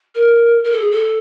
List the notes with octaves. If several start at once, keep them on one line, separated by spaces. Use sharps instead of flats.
A#4
A#4
A4
G#4
A4